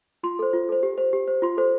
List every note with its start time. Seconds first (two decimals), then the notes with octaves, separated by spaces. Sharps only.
0.23 F4 C6
0.39 A4 C5
0.53 F4
0.69 A4 C5
0.83 G4
0.98 C5
1.13 G4
1.28 C5
1.42 F4 C6
1.57 A4 C5